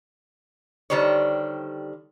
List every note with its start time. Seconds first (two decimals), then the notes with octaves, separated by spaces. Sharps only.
0.90 D3 D#3 G3 C5 C#5